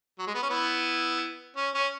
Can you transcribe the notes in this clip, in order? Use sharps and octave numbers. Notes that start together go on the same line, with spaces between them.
F#3
G#3
B3
C#4
B3 E4
C#4
C#4